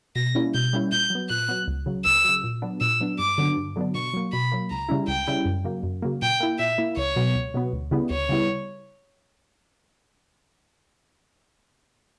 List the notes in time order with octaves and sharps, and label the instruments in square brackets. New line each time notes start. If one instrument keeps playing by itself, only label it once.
[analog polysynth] B2 [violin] A#6
[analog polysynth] G3 A#3 C#4 E4
[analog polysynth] B2 [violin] G6
[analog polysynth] G3 A#3 C#4 E4
[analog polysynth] A#2 [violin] G6
[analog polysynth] F#3 B3
[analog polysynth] A#2 [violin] F#6
[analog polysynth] F#3 B3
C#2
C#3 F#3
[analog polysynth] C#2 [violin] E6
[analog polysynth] C#3 F#3
A#2
F#3 B3 D4
[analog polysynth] A#2 [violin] E6
[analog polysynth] F#3 B3 D4
[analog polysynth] G2 [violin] D6
[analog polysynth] D3 F#3 B3 D4
G2
D3 F#3 B3 D4
[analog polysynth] B2 [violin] C#6
[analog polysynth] F#3 A#3
[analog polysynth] B2 [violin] B5
[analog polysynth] F#3 A#3
[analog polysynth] C#2 [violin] A#5
[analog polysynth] C#3 G3 C#4 E4
[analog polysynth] C#2 [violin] G5
[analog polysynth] C#3 G3 C#4 E4
F#2
C#3 F#3 A#3
F#2
C#3 F#3 A#3
[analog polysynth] A#2 [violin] G5
[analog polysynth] A#3 E4
[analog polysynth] A#2 [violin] E5
[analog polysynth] A#3 E4
[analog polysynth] C#2 [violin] C#5
[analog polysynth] B2 F#3 B3
C#2
B2 F#3 B3
D2
C#3 G3 B3 E4
[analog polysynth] D2 [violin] C#5
[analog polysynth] C#3 G3 B3 E4